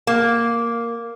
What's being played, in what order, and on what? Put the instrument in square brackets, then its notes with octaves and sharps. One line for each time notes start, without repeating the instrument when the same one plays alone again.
[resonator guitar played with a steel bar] A#3